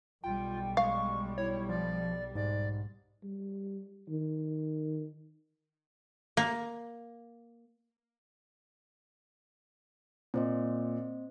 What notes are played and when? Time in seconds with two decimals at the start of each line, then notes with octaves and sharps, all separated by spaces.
0.24 B1 G3 F4 G5
0.77 G#3 F5 C#6
1.38 E4 C#5
1.69 F3 D5
2.35 G#2 D5
3.23 G3
4.09 D#3
6.37 A#3
10.34 A#2 C4 C5 D#5